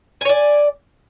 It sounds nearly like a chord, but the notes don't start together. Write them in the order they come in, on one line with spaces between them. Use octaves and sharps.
G#5 C#5 D5